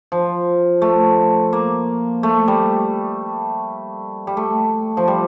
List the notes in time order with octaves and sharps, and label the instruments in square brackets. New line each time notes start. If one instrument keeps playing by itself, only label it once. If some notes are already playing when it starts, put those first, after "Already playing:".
[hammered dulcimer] F3
A3
A#3
A3
G3
G3
A3
F3
G3